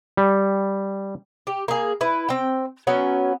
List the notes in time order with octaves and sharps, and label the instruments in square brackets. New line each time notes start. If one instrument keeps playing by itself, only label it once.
[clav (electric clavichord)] G3
[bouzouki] G4
A#3 G#4
E4 B4
C4 G5
F#3 B3 C#4